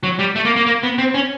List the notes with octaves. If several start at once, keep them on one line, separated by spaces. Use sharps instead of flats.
F#3
G3
A3
A#3
A#3
A#3
B3
C4
C#4